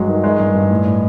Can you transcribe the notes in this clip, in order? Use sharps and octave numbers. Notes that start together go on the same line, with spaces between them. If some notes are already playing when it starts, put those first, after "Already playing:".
Already playing: G2 F#3 G#3
D#3
D#3 G#3
G2
G2
A2
A2